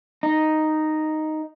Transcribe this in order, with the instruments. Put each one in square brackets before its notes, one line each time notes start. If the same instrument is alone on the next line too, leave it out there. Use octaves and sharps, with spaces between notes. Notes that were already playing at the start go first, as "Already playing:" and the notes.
[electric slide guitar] D#4